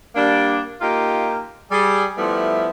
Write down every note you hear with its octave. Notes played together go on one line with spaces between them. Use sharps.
G3 A#3 D4
A#3 D#4 F4 G4
G3 G#4
F3 G3 A3 B3 E4